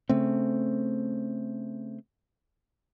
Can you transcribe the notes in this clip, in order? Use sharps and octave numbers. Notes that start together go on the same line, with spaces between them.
C#3 A3 C4